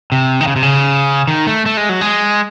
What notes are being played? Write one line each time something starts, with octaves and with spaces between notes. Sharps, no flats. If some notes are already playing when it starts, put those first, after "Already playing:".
C3
D#3
C#3
C3
C#3
D#3
A3
A3
G#3
F#3
G#3